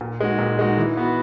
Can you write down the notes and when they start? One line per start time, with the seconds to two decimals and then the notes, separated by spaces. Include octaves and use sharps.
0.01 A#2
0.20 G#3 D#4 F#4
0.39 A#2
0.59 G#3 D#4 F#4
0.78 E3
0.97 B3 F#4